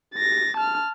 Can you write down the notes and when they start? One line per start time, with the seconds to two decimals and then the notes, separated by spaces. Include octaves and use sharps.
0.15 A6 A#6
0.57 A5 F6